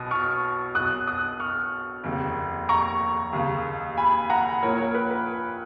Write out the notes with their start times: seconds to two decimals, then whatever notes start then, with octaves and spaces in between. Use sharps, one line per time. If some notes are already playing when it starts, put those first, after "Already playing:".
Already playing: B1 B2 D#6
0.11 C#6 F6
0.75 B1 B2 D#6 F#6
1.07 D#6 F#6
1.40 C#6 F6
2.04 F1 D#2 C#3
2.69 A#5 C#6
3.33 D#2 C#3
3.97 G#5 B5
4.30 F#5 A#5
4.62 A#1 A#2 A#4 C#5
4.78 A#4 C#5
4.94 B4
5.11 B4